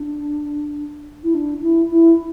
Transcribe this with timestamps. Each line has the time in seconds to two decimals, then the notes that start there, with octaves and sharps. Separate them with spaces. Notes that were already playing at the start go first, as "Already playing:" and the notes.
Already playing: D4
1.24 E4
1.34 D4
1.62 E4
1.91 E4